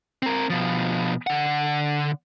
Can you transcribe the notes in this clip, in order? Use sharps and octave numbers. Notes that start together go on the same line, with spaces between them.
C4 A#4
B2 F3
D3 F#5